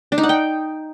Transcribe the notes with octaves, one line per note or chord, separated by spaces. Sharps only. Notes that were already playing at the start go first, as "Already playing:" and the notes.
D4
D#4
F#5
G5